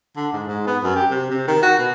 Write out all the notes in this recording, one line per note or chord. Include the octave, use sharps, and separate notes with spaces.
D3
G#2
G#2
B3
F#2
G4
C3
C3
D#3
F#4
B2